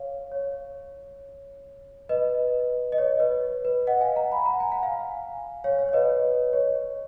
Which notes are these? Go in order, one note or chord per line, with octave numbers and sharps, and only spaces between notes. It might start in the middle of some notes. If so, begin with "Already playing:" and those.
Already playing: C#5 F5
C#5
B4 D#5
D#5
C#5
B4
B4
D#5 F#5
F5 G#5
F#5 A#5
G#5 B5
F#5 A#5
G#5
F#5
F5 G#5
C#5 F5
C#5
C#5
B4 D#5
C#5